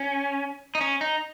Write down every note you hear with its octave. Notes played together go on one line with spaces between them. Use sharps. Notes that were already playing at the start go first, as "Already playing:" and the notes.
Already playing: C#4
D#4
C#4
D#4